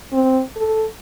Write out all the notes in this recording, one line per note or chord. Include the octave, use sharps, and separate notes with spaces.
C4
A4